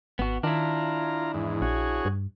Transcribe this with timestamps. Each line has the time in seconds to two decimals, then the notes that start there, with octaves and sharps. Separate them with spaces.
0.19 G#1 B3 F#4
0.43 D#3 D4 E4 F4 A#5
1.34 E2 G#2
1.62 A#1 F#4 G#4 C#5
2.05 G2